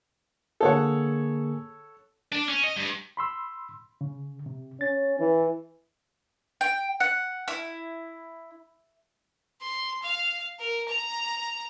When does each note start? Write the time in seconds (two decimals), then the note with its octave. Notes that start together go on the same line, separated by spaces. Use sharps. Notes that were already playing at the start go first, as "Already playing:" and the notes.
0.61 D3 A#3 G#4 A4 C#5 F#5
2.32 D4
2.49 C#4
2.64 D#5
2.77 G2
3.17 B5 C6 E6
4.01 C#3
4.46 C3
4.81 C#4 A6
5.20 E3
6.61 G5
7.00 F#5
7.48 E4
9.61 C6
10.02 F5
10.59 A#4
10.88 A#5